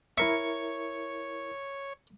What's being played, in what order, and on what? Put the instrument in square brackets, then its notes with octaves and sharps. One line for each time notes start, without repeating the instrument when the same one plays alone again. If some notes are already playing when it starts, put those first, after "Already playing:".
[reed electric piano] E4 A#4 E5 [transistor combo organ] C#5 [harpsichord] C#6